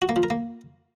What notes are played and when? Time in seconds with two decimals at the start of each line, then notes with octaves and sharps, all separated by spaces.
0.02 F#4
0.09 A#3
0.16 F3
0.23 A#4
0.30 A#3